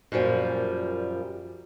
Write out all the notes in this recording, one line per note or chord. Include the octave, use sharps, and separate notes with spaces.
F#2 A#2 F3 G3